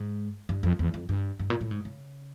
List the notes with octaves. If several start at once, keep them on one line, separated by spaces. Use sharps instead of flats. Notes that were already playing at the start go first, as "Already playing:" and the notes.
Already playing: G#2
G2
F2
E2
F2
G2
G2
A#2
A2
G#2
C#3